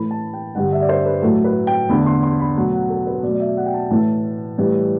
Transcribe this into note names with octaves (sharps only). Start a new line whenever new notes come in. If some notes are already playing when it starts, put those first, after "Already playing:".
Already playing: A2 E3 A3 B5
A5
G5
G2 D3 G3 F#5
E5
D5
C5
B4
A2 F#3 A3 A4
B4
G5
E2 D3 A3 B5
C6
C6
B5
B2 F#3 A3
F#5
A4
B4
B2 F#3 A3 D5
D5
E5
F#5
G5
A5
A2 E3 A3 A5
A2 E3 G3